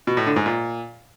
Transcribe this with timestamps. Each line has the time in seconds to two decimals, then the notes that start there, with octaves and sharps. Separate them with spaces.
0.07 B2
0.17 A2
0.27 D3
0.36 G#2
0.46 A#2